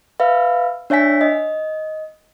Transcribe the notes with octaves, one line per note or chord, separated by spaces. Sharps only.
B4 E5 F5
D4 C#5 E5 G#5 B6
D#5